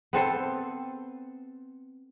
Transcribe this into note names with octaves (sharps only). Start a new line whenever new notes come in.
B3 C4 A4 C5